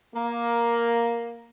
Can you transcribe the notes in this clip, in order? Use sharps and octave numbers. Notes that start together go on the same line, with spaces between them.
A#3